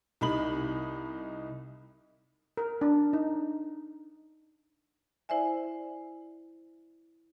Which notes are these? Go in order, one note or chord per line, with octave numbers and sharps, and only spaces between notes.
C2 D#4 B5 F#7
A#4
D4
D#4
E4 C5 D5 E5 G#5